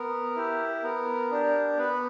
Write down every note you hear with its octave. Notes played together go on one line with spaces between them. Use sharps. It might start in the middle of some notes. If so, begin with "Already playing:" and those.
Already playing: B3 A#4
E4 G4
B3 A#4
D4 G4
B3 B4